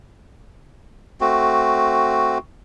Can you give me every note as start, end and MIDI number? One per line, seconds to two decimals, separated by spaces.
1.21 2.38 57
1.21 2.38 60
1.21 2.38 66